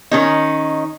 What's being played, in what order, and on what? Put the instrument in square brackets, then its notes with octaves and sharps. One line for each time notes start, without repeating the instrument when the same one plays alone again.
[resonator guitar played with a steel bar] D#3 C#4 D#4